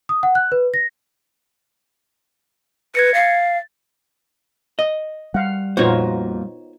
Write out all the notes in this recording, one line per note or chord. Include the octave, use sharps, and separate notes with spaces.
D#6
F#5
F#6
B4
A#6
B4 G#6 A#6 C#7
F5 A6
D#5
G3 F5 F#5
F2 A#2 B3 D#4 F4 F#4 C5 C#5